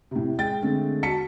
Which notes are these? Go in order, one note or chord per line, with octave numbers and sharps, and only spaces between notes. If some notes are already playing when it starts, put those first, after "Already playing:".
A2 C3
G#3 G5 A6
D3 G#3 A3 C4
F#4 A5 B6 C#7